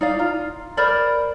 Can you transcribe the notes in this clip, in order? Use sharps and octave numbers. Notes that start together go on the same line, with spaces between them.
D#4 D5 F5
F4 A#5
A#4 C5 D5 B5